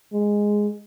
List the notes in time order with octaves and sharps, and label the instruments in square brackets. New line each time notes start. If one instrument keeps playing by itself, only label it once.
[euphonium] G#3